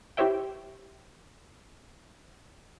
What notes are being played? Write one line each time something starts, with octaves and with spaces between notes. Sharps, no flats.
E4 G4 C5 C#5 E5 G5